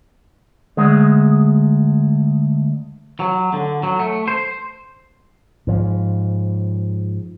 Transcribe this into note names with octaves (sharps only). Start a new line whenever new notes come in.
D2 G#3
F#3
D3
F#3
A3
C5
G#2 F3